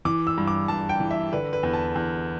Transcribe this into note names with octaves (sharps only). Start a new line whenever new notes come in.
E3 D6
E6
G2
D6
G2 A5
G5
E3
E5
D3 B4
B4
E2
A5
E2